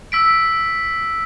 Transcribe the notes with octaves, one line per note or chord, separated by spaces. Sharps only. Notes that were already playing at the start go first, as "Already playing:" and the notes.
E6 B6 D7